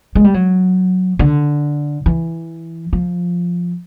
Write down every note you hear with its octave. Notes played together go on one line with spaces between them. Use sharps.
G#3
G3
F#3
D3
E3
F3